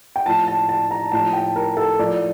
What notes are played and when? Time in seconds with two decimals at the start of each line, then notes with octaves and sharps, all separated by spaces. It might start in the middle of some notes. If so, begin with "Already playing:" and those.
0.16 G5
0.25 A2 F3 A5
0.48 A5
0.69 A5
0.91 A#5
1.12 A2 F3 A5
1.33 G5
1.56 A#4
1.77 A4
1.99 A2 F3 D5